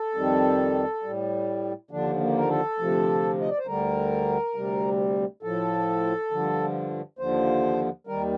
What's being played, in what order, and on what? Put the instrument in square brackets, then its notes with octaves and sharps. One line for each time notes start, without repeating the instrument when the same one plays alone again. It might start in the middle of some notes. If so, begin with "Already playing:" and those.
Already playing: [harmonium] A4
F2 D#3 G3
A2 G3
D#2 D3 F3 D4
A#3
A#4
A4
D2 C3 F3
D#5
D5
C5
D2 D3 G3 A#4
D2 C3 G3
A2 F3 A4
G2 D3 F3
D#2 D3 F3 C5
D#2 D#3 G3 A#4